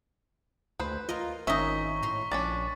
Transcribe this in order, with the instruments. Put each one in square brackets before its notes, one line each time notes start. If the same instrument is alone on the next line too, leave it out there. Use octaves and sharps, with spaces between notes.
[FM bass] D2 [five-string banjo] B4 C5
[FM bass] F4 [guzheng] A#4 D#5
[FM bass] G#1 [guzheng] C#4 D#4 [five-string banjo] D#5 E5 [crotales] C#6 B6 G7
[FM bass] A2 [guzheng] A#5 C6
[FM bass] A#1 [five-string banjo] C#4 D4 D5